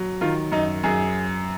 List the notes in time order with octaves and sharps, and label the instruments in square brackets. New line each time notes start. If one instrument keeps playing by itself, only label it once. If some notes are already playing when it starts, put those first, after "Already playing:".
Already playing: [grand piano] F#3
D#3 F4
F#2 D#4
F#2 G#4